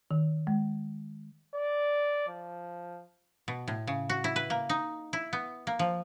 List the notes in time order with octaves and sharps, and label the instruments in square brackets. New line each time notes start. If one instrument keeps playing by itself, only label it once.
[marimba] D#3
G#3
[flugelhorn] D5
F3
[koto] B2
A2
C#3
F#4
E4
B4
A#3
D#4
E4
B3
A#3
F3